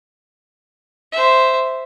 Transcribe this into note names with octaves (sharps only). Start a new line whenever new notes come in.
C5 E5